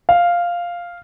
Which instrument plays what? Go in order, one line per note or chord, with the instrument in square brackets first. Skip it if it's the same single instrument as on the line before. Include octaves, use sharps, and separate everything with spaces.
[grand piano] F5